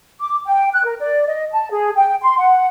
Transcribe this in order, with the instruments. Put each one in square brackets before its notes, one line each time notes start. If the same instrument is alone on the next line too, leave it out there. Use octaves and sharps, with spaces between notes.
[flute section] D6
G5
F#6
A#4
D5
D#5
A5
G#4
G5
C6
F#5